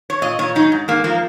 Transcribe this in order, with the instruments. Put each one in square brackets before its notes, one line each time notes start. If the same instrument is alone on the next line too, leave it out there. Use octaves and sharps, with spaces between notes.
[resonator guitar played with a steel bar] C#5
A#2 D#5
A#2 C#5
F#3 D#4
G#2
G#2 A#3
F3 A#3